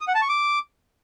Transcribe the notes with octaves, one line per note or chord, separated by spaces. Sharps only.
D#6
F#5
A5
C#6
D6